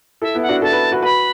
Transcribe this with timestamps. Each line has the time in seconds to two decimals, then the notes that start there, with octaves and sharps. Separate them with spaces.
0.22 E4 A4 E5
0.35 B3 E4
0.42 F#5
0.49 D4 F#4
0.62 E4 A4 A5
0.72 F#4 B4
0.92 F#4 B4
1.02 F#4 B4 B5